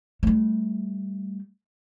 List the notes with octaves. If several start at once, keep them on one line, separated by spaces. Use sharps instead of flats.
G3 A3